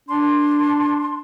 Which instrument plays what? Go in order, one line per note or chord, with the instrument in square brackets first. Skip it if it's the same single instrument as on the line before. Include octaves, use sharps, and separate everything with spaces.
[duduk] D4 [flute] C6